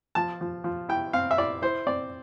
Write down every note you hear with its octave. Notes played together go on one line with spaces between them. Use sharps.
F3 A5
F3
F3
E4 G5
C4 F5
E5
E4 D5
E4 C5
C4 D5